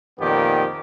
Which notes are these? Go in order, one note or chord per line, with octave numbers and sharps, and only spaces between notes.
F2 A#2 D#3 B3 G4